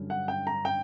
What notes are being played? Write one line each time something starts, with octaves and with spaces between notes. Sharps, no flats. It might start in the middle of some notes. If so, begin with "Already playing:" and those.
Already playing: G2 D3 F#3 C#4
F#5
G5
A#5
G5